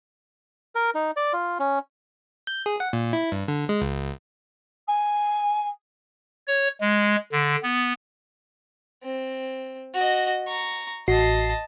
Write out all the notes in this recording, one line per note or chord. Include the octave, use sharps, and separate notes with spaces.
A#4
D#4
D5
F4
C#4
G6
G#4
F#5
A#2
E4
G2
D3
G#3
C#2
G#5
C#5
G#3
D3
B3
C4
F#4 D#5
A#5 C#6
A1 F#4 D#5 A5 C7